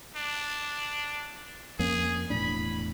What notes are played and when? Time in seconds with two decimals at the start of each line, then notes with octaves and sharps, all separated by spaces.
0.16 D4
1.79 F2 A#3 C#4 G#4
2.30 E1 A2 D4 B5